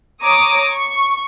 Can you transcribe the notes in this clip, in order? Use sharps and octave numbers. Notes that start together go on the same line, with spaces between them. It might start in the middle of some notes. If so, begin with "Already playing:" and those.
C#5 A#5 D6 D#6
C#6